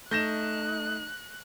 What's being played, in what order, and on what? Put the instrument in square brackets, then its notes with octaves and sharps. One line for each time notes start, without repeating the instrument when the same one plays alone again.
[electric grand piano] A3 [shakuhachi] D#4 [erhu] F#6 [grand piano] G6 A#6 E7